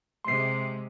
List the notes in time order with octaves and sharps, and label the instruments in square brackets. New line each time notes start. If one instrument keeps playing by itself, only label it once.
[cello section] C3 G#3 [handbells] C6 C7